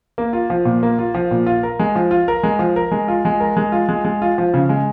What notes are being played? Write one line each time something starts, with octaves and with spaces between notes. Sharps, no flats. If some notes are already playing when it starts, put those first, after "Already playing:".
A#3
F4
F3
A#2
A#3
F4
F3
A#2
F4
A#4
G#3
F3
F4
A#4
G#3
F3
A#4
G#3
F4
G#3
A#4
G#3
F4
G#3
G#3
F4
F3
C#3
G#3